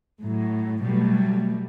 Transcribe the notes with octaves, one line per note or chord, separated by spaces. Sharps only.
A2 F#3
B2 F#3 G3 A3